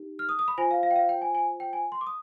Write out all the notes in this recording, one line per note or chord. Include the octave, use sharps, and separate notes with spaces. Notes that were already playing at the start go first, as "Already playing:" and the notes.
Already playing: D#4 G4
F6
D#6
D#6
B5
F4 C5 G#5
F5
F5
G5
F5
G5
G#5
G#5
G5
G#5
C6
D6
D#6